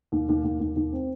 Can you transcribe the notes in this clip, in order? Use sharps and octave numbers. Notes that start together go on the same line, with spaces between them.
D#2
D#2
D#2
D#2
D#2
C4